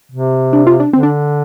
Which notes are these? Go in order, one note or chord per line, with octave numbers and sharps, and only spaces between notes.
C3
D4
F4
D4
D3 C4
D4